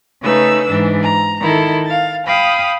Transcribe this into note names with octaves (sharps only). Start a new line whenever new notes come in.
C#3 A3 D#4 B4 E6
G#2 E3 D4
A#5
D#3 E4 A4
F5 A6
F5 G5 B5 D#6